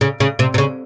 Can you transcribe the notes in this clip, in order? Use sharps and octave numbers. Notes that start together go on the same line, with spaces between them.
C#3
C#3
C3
C3
C#3